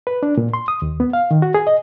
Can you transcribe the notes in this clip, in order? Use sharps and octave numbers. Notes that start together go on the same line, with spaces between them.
B4
D4
A#2
C6
D#6
D#2
B3
F5
D#3
F#4
G#4
D#5